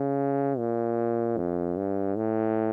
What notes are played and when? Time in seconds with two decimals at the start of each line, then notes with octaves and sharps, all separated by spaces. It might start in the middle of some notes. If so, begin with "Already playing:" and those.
Already playing: C#3
0.58 A#2
1.38 F2
1.77 G2
2.16 A2